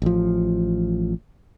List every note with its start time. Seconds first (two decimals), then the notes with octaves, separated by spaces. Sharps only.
0.02 A1 F3